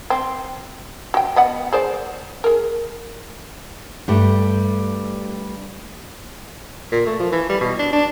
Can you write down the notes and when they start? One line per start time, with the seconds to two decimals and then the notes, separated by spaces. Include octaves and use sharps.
0.10 C4
1.14 F#4 G5
1.36 B3 D#5 F#5
1.73 G#4 C5 D5
2.44 G#4 A#4
4.08 G2 G3 A3
6.92 A#2
7.06 A3
7.20 F3
7.32 E3
7.49 G3
7.61 B2
7.79 D4
7.93 D4